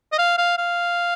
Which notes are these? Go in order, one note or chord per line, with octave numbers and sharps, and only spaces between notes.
D#5
F5
F5
F5